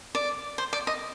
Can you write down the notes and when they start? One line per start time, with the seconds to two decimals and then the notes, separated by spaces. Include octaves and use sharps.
0.15 D5
0.58 C5
0.73 D5
0.87 D#5